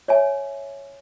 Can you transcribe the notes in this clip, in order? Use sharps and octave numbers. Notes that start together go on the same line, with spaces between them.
C#5 E5 G#5